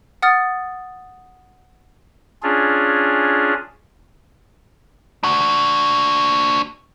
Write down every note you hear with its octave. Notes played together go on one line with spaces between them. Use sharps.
F#5 D#6 F6 A6
C#4 D4 F4 G#4
D4 F#4